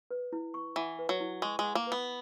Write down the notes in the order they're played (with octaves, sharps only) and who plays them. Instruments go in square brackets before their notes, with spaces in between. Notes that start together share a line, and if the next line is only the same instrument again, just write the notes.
[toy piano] B4
E4
C#6
[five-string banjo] E3 [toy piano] F#5
[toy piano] B4
[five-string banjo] F#3
[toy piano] E4
[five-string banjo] G#3 [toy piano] C#6
[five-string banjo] G#3
[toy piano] F#5
[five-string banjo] A#3
[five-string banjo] B3 [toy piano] B4